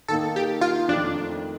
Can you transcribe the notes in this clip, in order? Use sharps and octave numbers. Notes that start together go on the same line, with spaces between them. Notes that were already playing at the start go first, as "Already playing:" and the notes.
D#3 A#3 D#4 A4
G4
F4
F2 D#3 A3 C4 D4 D#4